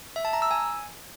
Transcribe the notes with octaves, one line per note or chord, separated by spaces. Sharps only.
E5
A5
A#5
E6
G#5